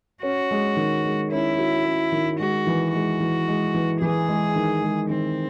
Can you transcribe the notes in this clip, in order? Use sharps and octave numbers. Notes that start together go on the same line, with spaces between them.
C#4 F#4
G#3
D#3
G#3
C#4 E4
F#4
C#4
D#3
G#3 F#4
E3
G#3 F#4
E3
G#3
E3
E3 G#4
G#3
D#3
G#3
D#3 C4